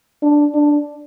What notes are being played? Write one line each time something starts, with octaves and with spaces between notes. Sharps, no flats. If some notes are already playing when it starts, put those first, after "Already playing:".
D4
D4